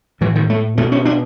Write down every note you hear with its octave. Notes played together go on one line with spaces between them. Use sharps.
A2 E3
D#3
A3
B2 A3
C#4
D4